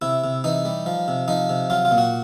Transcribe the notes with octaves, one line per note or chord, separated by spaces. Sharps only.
C3 E4
C3
E3 D#4
G3
F3
C3
F3 D#4
C3
F#3 F4
F4
A#2
F#4